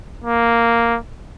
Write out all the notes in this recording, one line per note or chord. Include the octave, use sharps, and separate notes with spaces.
A#3